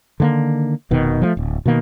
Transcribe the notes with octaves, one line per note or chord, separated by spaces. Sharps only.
D3 D#3 G#3 A#3
F1 B2 D#3
F3 G3 A3
D1
B2 D#3 A#3